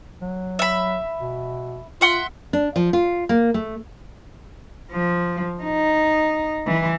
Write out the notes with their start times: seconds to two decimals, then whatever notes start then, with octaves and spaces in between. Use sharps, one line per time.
0.22 F#3
0.59 E5 B5
1.20 B2
2.01 F4 E5 F#5 C6
2.53 D4
2.76 F3
2.93 F4
3.29 A#3
3.54 A3
4.91 F3
5.63 D#4
6.67 E3